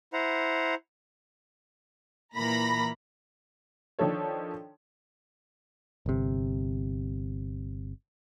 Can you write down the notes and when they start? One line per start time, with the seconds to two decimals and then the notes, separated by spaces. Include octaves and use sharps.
0.13 E4 C5 F#5 A#5
2.36 A#2 E3 A#3 A#5 B5 A#6
3.99 D#3 F3 D4 A4 C#5
6.06 G1 C3